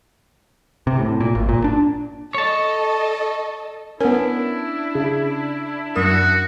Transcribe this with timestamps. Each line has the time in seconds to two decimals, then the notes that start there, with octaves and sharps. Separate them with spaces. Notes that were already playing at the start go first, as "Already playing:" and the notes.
0.87 C3
0.99 A2
1.20 A#2
1.35 G#1
1.49 A#2
1.64 D4
2.35 A4 C#5 D#5 A5
4.01 B3 C#4 D4 E4 A#4
4.95 C#3
5.95 F#2 F#4 A#4 D#6 E7